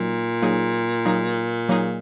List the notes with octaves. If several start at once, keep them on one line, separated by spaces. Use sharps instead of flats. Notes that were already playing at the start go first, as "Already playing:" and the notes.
Already playing: A#2 F#3 A#3 D#4
F#3 A#3 D#4 G#4
F#3 A#3 D#4 G#4
F#3 A#3 D#4 G#4